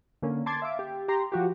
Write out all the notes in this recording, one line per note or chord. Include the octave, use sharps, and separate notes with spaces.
D3 A#3 C#4
A5 C6 D6 G#6 A6
E5 F5 D6
G4
G4 A#5 C6
F3 F#4 G4